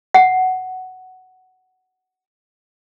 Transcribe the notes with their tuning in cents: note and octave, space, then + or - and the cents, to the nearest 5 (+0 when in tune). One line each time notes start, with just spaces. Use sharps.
F#5 +5